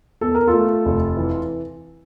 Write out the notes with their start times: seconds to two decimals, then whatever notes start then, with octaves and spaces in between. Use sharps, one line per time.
0.21 E2 A4
0.35 A#4
0.47 F4 A4
0.54 A3
0.85 F1
1.17 E3